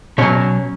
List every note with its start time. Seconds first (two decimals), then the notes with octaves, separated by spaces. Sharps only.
0.18 B2 F#3 C#4 C#5